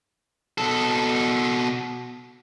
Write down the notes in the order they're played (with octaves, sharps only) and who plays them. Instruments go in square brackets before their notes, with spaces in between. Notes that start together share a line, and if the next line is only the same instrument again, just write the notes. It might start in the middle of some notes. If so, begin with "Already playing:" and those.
[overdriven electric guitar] B2 A4